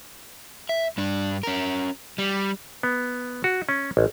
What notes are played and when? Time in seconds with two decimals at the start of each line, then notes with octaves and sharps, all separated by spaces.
0.69 E5
0.98 G2 D4
1.43 C#4 A#4
2.18 G3
2.83 B3
3.44 F#4
3.69 C#4
3.97 A1